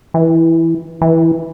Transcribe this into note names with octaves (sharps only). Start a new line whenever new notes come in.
E3
E3